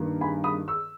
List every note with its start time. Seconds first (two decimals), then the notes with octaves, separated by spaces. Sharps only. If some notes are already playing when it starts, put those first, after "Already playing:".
Already playing: G2 D#3 A#3
0.21 G#5 B5
0.44 B5 D#6
0.68 C#6 E6